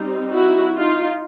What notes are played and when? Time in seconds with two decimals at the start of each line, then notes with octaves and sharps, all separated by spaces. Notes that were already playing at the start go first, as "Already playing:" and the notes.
Already playing: G3 C4 D#4
0.33 E4 F#4
0.75 D#4 F4